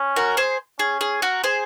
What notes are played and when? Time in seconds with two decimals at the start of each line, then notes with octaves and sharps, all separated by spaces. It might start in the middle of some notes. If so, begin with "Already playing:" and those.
Already playing: C#4
0.16 F#4 A#4
0.37 G#4 C5
0.79 C#4 G#4
1.01 G#4
1.22 F#4 A#4
1.44 G#4 C5